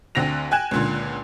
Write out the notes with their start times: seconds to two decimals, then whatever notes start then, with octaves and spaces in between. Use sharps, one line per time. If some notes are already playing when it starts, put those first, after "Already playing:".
0.15 D2 D3 C4 A#6 F7
0.51 G5 G#5 F#6 G#6 E7
0.71 C#2 A#2 D3